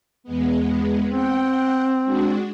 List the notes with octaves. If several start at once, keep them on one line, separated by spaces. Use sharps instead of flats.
E2 G#3 B3
C4 F#5 G5
G#3 D4 F#4